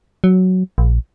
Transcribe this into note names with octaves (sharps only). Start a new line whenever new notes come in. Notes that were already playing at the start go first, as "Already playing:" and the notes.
F#3
A#1